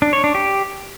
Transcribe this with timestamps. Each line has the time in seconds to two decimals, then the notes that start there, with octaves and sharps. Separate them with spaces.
0.02 D4
0.13 C#5
0.24 D4
0.35 G4